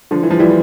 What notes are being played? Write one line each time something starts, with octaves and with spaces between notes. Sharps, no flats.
D3 F3
E3
F3
E3 G3